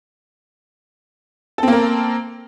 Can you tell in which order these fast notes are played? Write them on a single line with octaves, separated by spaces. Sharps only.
A4 C4 A#3 A#4